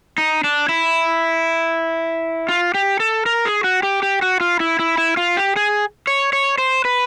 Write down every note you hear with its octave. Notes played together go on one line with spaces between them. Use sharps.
D#4
D4
E4
F4
G4
A4
A#4
G#4
F#4
G4
G4
F#4
F4
E4
E4
E4
F4
G4
G#4
C#5
C#5
C5
B4